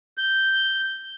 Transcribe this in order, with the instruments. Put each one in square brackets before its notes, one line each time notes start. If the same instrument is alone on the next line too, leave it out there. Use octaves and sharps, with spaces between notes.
[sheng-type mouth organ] G6